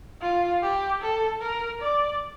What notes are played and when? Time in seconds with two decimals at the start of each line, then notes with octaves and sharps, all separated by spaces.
0.21 F4
0.62 G4
1.02 A4
1.42 A#4
1.81 D5